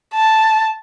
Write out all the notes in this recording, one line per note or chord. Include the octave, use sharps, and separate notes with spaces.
A5